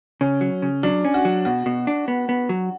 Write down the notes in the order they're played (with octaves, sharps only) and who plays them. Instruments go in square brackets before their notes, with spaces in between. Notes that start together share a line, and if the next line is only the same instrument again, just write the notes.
[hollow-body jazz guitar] C#3 [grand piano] C#4
[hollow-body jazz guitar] F#3
C#3
[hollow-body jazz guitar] F#3 [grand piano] D4
[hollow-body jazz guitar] C#4
[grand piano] F#4
[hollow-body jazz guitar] F#3
[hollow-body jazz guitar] B2 [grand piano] F#4
[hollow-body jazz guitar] B2
D4
B3
B3
F#3